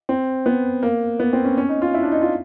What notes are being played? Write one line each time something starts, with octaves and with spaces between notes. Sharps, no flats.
C4
B3
A#3
B3
C4
C#4
C#4
D#4
F4
E4
D4
D#4
F4